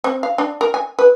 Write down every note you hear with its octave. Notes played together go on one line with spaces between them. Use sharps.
C4
F5
D4
A#4
G#5
B4